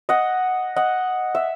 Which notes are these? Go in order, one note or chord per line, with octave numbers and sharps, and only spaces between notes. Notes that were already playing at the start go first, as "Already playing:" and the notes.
D#5 F#5
D#5 F#5
E5